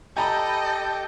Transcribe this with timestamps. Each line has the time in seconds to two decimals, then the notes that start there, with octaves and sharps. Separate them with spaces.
0.17 G4 A4 D#5 G5 G#5 A#5 B5